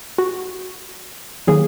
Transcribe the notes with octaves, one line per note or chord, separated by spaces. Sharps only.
F#4
D#3 F#3 A#3 G#4